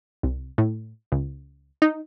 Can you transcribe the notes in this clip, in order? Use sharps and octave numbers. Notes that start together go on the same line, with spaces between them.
C2
A2
C#2
D#4